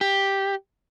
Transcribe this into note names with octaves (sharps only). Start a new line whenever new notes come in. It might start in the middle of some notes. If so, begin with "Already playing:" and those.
G4